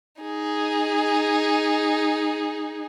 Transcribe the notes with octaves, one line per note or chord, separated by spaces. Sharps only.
D#4 G#4